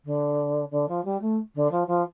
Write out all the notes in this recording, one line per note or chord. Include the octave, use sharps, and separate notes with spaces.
D3
D3
F3
G3
A3
D3
F3
F3